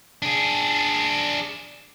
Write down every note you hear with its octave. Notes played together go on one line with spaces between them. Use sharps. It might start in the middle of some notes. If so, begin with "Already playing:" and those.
D4 G#4